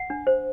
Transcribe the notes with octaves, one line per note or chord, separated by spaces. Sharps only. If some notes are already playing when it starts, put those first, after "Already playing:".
Already playing: F#5
D4
C5